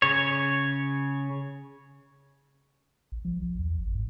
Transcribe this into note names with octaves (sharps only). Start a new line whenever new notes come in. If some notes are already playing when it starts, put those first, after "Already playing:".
C#3 C#5
A#1
F3
B1
E2
G#1
G#2